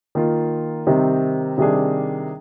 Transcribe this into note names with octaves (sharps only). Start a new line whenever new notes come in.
D#3 A#3 F4 A#4
C3 D#3 G3 C4 D#4
C3 D#3 G3 D4 G#4